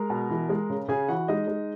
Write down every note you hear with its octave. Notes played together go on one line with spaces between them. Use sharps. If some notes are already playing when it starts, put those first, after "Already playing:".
Already playing: G#3 A#4 A#5
B2
E3
G#3
C#3
C#3 G#4 G#5
E3 F#4 F#5
G#3 D#4 D#5
G#3